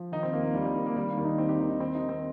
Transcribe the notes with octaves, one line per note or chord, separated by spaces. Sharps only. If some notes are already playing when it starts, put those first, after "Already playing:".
Already playing: F3
D#3 D#4
C4
D#2 A#3
A#3
D#2 G3
G3
D#2
A#3
D#3 G3
A#3
D#2
D#4
D#3 C4
G4
D#2 D#4
D#4
D#3 C4
D#4
D#3
C4